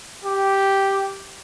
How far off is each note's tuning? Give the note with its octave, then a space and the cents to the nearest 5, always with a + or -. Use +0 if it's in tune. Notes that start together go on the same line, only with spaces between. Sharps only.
G4 -5